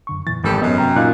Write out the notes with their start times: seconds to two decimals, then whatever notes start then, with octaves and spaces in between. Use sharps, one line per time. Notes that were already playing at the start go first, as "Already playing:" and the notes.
0.07 F#2 D3 C#6
0.27 F2 A#2 E3 A6
0.44 G#1 E3 G3 A3 G4 A4
0.62 F#2 B3 D#5
0.78 C3 G5 A#5
0.96 A#2 D#4 D#5 F5 F#6